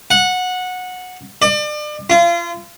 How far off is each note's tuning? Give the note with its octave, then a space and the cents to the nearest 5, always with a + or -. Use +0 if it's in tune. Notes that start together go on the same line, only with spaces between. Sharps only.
F#5 -15
D5 +35
F4 -30